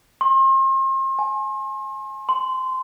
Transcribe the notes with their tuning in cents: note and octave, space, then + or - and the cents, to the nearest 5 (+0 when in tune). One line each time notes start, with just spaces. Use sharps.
C6 +40
G#5 +25
C6 -20